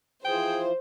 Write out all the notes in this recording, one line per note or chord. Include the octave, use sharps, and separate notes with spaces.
E3 F3 G#4 C5 G5